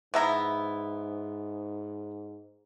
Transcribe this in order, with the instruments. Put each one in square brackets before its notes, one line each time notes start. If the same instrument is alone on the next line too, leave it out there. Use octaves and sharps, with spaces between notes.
[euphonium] G#2 [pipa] F3 E4 [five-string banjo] B3 E5 A#5